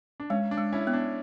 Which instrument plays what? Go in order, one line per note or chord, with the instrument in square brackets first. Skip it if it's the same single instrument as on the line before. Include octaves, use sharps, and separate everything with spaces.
[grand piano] D4
[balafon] G#3 [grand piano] C#4
[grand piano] D4
[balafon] G#3
[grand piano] C#4 E4
[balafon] B3
[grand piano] D4